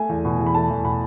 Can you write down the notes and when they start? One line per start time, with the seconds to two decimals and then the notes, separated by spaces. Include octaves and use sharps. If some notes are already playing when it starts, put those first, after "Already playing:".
Already playing: A3 G#5
0.09 E2
0.25 B2
0.40 E2
0.46 B5
0.55 A3 A5
0.70 E2
0.85 B2 B5